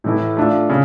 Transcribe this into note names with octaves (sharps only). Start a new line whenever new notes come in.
A2 E3 A3 E4
A3 D4 F4
C#3